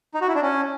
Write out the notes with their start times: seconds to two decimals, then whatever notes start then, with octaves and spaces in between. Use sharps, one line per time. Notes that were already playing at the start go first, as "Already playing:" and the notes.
0.14 D#4
0.21 F#4
0.28 E4
0.35 D4
0.42 C#4